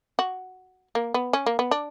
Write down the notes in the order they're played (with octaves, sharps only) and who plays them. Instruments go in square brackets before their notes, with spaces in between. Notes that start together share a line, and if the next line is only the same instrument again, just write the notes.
[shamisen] F#4
A#3
B3
C#4
A#3
B3
D4